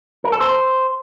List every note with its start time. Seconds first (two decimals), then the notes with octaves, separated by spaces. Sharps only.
0.24 A#4
0.32 A4
0.41 C5